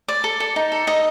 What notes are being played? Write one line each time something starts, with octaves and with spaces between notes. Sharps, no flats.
D5
A4
A4
D#4
A4
D#4 D#5